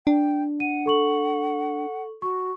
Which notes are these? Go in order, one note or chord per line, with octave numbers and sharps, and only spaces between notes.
D4 G5
F#5 D#7
A4 C#6 F#7
F#4 C#6